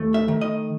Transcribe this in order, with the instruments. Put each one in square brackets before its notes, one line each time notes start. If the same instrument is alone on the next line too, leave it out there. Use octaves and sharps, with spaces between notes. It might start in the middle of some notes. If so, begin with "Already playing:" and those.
Already playing: [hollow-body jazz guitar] D#2 A3
E5
D#3
D#5